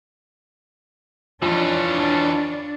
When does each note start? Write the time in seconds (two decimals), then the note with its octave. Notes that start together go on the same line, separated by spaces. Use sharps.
1.42 F2 E3 C#4 D4 F4